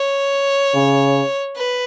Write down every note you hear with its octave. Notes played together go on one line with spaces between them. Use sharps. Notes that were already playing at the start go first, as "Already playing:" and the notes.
Already playing: C#5
C#3
B4